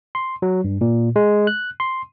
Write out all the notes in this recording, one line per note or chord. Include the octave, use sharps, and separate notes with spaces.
C6
F#3
G2
A#2
G#3
F#6
C6